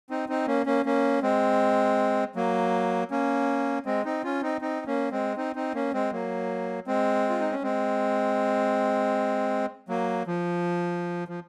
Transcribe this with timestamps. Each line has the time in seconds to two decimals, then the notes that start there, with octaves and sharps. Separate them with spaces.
0.10 C4 D#4
0.29 C4 D#4
0.47 A#3 C#4
0.66 A#3 C#4
0.85 A#3 C#4
1.23 G#3 C4
2.36 F#3 A#3
3.11 A#3 C#4
3.86 G#3 C4
4.05 C4 D#4
4.24 C#4 F4
4.42 C4 D#4
4.61 C4 D#4
4.86 A#3 C#4
5.11 G#3 C4
5.37 C4 D#4
5.56 C4 D#4
5.74 A#3 C#4
5.94 G#3 C4
6.12 F#3 A#3
6.87 G#3 C4
7.29 F4
7.40 D#4
7.52 C#4
7.63 G#3 C4
9.89 F#3 A#3
10.27 F3
11.28 F3